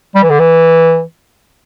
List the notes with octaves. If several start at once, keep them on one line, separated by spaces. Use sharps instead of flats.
G3
E3
D3
E3